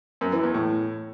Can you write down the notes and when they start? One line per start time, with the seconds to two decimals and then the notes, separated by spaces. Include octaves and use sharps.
0.21 F#2
0.32 E3
0.43 E2
0.54 A2